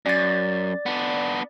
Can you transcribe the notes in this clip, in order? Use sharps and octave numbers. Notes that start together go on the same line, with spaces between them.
F#2 D5 A6
B3 D4